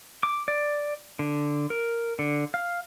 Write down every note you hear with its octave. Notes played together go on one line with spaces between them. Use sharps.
D6
D5
D3
A#4
D3
F5